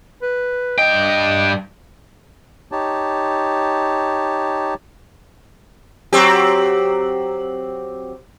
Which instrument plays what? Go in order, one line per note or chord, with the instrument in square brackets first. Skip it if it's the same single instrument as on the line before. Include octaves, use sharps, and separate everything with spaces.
[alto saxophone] B4
[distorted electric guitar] G2 G5 [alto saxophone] D#5
[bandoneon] D#4 G4 C#5 A5
[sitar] F#3 C4 G4